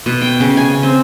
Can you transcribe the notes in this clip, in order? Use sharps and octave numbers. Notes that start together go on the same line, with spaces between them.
B2
G5
C#3
G#5
C#4
C4